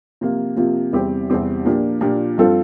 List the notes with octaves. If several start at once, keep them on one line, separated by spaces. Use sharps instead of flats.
C3 F3 A#3 F4
C3 F3 A#3 F4
E2 C3 G3 C4 G4
E2 C3 G3 C4 G4
A#2 F3 A#3 D4 G4
A#2 F3 A#3 D4 G4
G2 F3 C4 F4 A4